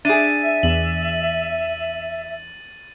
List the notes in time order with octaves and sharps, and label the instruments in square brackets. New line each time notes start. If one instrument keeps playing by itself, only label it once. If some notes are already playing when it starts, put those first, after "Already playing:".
[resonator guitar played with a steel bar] D4 G#4 [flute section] E5 [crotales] A6 D#7
[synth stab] E2 [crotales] F#7